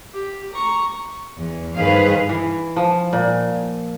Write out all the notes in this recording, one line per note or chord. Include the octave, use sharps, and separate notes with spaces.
G4
A#5 C#6
E2
G2 D#3 G#4 B4 C5 F5
E3
F3
A#2